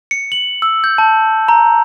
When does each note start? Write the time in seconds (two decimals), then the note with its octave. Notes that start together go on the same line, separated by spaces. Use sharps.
0.11 C#7
0.32 F#7
0.62 E6
0.84 G6
0.98 A5
1.48 A#5